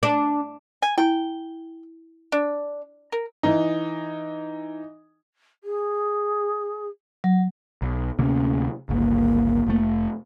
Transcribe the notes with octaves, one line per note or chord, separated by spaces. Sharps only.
D4
G#5
E4 G5 G#5
D4
A#4
E3 D#4
G#4
F#3
B1
D2 C3 A#3 C#4
G1 C#2 A#3
F1 A3